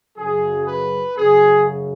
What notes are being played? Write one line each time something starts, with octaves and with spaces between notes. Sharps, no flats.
F#2 C#3 F#3 G#4
B4
F#2 C#3 F#3 G#4